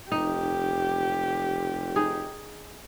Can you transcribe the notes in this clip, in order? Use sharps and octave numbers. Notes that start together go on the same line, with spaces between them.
F1 D#4 G4
D#4 G#4